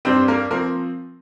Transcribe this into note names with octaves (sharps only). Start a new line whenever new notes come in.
G2 G3 C4 D4 C5
A#3 A#4
F3 A#3 C4 A#4